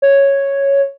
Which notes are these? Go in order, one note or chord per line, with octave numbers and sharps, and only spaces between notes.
C#5